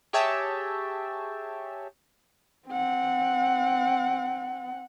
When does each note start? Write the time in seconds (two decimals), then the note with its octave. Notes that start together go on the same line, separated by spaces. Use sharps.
0.13 G4 G#4 C#5 E5 G5 A5
2.69 C4 F#5